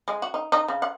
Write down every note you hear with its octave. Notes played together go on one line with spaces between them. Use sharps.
G#3
F#4
D#4
D#4
C#3
F#5